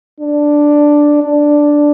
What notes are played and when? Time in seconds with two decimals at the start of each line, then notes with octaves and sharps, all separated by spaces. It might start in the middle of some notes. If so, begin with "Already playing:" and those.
0.20 D4
1.23 D4